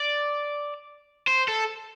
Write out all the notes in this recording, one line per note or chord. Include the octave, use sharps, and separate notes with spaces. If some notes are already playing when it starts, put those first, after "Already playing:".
Already playing: D5
C5
A4